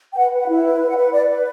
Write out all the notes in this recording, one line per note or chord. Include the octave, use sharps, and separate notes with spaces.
G5
B4 F#5
B4
F#5
E4
B4
B4
F#5
B4
B4 D5
B4